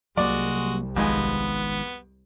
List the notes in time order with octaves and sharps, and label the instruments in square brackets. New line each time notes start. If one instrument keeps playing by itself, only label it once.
[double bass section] C2 [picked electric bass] F#3 A#3 [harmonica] G#3 F#4 [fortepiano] D5
[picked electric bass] G#1 G#2 [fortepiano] F2 G#3 G#5 [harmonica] B3